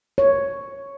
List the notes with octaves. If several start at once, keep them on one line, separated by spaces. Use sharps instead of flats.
C#5